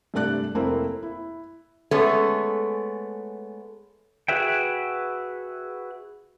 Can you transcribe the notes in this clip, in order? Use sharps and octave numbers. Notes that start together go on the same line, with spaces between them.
G2 C3 A3 D4 D5 F#6
F1 A#3 C4 E4
E4
G#3 A3 B3 C#4 A4
F#4 G#4 B4 E5 G5